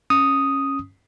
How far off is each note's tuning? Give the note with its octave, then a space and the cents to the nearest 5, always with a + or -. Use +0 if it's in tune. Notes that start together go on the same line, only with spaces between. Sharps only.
C#4 -10 D#6 +0